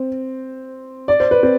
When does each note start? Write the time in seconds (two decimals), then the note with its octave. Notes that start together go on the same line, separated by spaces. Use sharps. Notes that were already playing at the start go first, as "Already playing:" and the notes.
Already playing: C4
1.08 D5
1.20 C5
1.31 B4
1.43 C4 C5